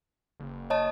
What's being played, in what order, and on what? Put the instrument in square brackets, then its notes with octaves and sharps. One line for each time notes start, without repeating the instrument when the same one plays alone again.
[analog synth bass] F#1
[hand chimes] C#5 D#5 A5